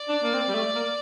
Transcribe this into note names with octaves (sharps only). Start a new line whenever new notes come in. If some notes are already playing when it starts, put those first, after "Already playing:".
Already playing: D5
D4
A#3
C4
G3
A3
A#3